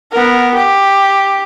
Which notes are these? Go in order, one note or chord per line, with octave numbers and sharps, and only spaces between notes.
B3 A#4
G4